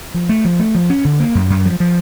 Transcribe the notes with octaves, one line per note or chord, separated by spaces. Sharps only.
F3
A3
F3
A3
F3
C#4
D3
A#3
F#2
F#2
F3
F3